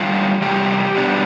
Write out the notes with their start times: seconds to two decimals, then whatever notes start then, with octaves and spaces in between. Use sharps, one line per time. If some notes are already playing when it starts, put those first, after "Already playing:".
Already playing: E2 D3 G3 F4
0.42 E2 C3 G3 G4
0.95 B2 G3 B3 D4